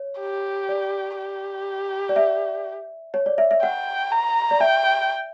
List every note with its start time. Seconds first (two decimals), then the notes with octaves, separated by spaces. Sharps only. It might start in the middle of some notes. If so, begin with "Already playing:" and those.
Already playing: C#5
0.20 G4
0.69 D5
1.18 G4
2.09 D5
2.16 E5
3.14 C#5
3.26 D5
3.38 E5
3.51 E5
3.63 F#5 G5
4.12 A#5
4.51 D5
4.60 E5 G5